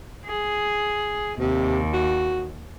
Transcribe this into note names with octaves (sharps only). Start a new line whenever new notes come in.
G#4
D#2 C3
F#4